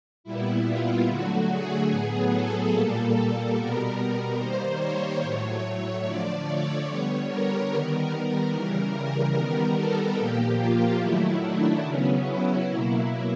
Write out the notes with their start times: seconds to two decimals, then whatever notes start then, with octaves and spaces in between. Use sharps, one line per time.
0.24 A#2 G3 B3 E4
0.66 F4
1.07 D3 F#3 A3 F#4
1.49 G#4
1.90 A2 F#3 B3 G#4
2.31 A4
2.73 A#2 G3 A#3
3.14 A4
3.55 B2 G3 B3 A#4
3.97 A#4
4.38 D#3 G3 A#3 C5
4.79 C#5
5.21 A2 F#3 A3
6.03 D3 F3 A3 D5
6.45 C#5
6.87 D3 G3 B3 C#5
7.28 A#4
7.69 D#3 G3 B3
8.53 C#3 E3 G3
8.93 A#4
9.34 D#3 G3 B3
9.76 A4
10.17 A#2 F3 A#3 G4
10.59 F4
11.00 D#3 F#3 A3 E4
11.42 D4
11.83 C#3 F#3 B3 C#4
12.24 E4
12.65 B2 F#3 A#3